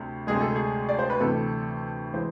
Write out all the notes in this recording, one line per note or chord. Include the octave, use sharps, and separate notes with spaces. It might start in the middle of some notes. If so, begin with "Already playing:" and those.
Already playing: D2 C3
D2 C3 G#3 G#4
A4
G#4
D5
C5
B4
D2 C3 E3 A3 A4
E3 G#3 C5